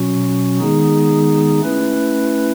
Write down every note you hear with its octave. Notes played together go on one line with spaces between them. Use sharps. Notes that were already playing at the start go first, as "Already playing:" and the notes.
Already playing: B2 F#3 C#4 F#4
D#3 G#3 B3 D#4 G#4
A3 C#4 E4 B4